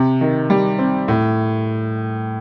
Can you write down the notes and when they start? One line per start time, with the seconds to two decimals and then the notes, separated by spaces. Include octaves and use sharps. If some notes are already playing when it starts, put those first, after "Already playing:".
Already playing: C3
0.21 D#3
0.50 G3
0.79 C4
1.08 A2